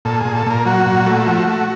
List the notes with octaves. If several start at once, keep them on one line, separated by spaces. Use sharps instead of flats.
A#2 A4
G#4
A#2
A4
A#2 A#4
F#3 F#4
A#2
A3
F3
A3